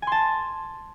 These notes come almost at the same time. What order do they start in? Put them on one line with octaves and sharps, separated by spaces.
G#5 C6 A5